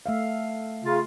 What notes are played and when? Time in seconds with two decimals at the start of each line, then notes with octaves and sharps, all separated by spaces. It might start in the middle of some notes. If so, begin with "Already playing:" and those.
0.06 A3 E5 F5
0.84 C#3 F4